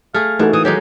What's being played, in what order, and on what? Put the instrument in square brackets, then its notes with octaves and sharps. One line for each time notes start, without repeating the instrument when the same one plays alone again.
[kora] A3 G#4 [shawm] F5 [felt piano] F6
[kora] E3 [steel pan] A3 F#4 A4 [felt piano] A#3 D#4 G#4
[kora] E3 [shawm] D#6
[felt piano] D#3 [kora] F#3 G#3 D#4 [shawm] G4